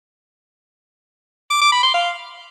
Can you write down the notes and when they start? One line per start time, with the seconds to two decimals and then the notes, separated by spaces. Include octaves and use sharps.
1.50 D6
1.61 D6
1.72 B5
1.83 C6
1.94 F5